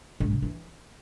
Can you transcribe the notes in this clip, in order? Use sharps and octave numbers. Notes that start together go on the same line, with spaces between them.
G#2
C3
E3